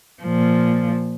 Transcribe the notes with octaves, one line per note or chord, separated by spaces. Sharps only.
A#2 F3